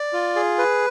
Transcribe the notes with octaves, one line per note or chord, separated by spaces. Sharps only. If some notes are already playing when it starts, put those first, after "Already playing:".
Already playing: D5
F4
G#4
B4